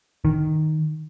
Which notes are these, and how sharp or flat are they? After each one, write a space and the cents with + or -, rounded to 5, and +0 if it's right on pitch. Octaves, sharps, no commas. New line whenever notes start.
D#3 -5